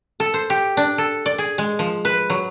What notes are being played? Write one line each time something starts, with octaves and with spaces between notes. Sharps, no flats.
A4
C5
G4
D4
A4
D5
G#4
G#3
F3
B4
F#3